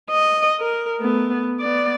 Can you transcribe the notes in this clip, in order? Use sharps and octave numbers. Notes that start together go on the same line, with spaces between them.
D#5
A#4
A3 B3
B3 D5